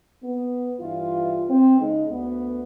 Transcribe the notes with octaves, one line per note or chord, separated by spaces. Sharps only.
B3
G2 E3 F4
C4
C#3 G#3 D#4
D2 B3